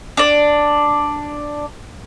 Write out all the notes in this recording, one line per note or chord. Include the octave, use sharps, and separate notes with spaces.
D4 D5